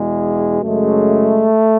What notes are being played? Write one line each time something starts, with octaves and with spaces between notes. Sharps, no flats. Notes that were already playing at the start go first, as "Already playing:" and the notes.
Already playing: E2 B2 G#3
F#2 C#3 G#3 A3